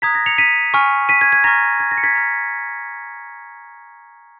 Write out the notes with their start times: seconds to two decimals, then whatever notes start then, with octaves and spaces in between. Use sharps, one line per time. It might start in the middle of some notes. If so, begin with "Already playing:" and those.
0.02 A#5 D#6 F#6 G#6 B6
0.15 A#6
0.26 C#7 F7
0.38 B6 D#7
0.74 G#5 C#6 F6
1.09 B6 D#7
1.21 G#6
1.32 G#6
1.44 A#5 C#6 F6 A#6
1.80 G#6
1.91 A#6
1.98 C#7
2.03 G#6 B6
2.15 A#5 F6